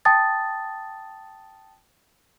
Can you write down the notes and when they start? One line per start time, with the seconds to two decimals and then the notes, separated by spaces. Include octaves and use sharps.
0.05 G5 A5 D#6 A6